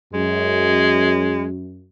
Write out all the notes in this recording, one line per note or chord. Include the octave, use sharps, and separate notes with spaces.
F#2 G#3